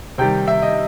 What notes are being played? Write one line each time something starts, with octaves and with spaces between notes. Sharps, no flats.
C3 D#3 G3 G5
E5
D#5